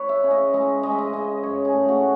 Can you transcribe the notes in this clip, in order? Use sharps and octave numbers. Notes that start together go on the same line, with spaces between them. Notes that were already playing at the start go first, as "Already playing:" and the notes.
Already playing: B4 C#5
E5
C#3
D#5
G#3 D#5
G#3 D#5
E5
D#5
C#3 D#5
F#2 C#5
G#4
A3
F#4